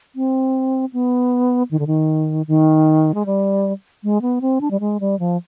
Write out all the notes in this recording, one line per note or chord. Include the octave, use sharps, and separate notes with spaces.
C4
B3
D#3
D3
D#3
D#3
G#3
G3
G#3
B3
C4
D4
G3
G#3
G3
F3